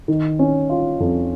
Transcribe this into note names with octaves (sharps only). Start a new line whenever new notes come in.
D#3
C#4
F4
F2